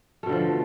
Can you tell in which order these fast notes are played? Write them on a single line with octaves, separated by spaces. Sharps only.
A3 B2 D3 F3